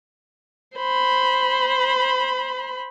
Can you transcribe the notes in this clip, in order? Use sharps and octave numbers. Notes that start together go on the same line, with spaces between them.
C5 B5